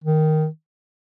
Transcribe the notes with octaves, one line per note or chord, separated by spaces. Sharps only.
D#3